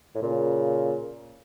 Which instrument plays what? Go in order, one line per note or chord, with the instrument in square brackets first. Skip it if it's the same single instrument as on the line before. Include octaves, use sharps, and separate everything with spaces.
[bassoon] A2
[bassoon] A#2 [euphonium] C#3